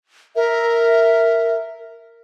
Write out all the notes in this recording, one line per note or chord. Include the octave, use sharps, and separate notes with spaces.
A#4 E5